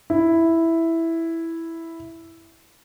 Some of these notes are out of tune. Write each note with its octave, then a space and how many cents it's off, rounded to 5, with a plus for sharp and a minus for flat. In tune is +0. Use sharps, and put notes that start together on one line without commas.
E4 +0